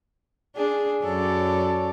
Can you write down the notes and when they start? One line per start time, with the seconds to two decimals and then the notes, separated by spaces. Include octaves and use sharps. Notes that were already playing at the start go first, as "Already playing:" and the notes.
0.56 D4 G#4
1.03 F#2 A4 C#5 D5